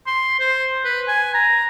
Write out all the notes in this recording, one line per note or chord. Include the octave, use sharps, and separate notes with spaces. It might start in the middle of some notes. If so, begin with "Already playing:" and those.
C6
C5
B4
G#5
A#5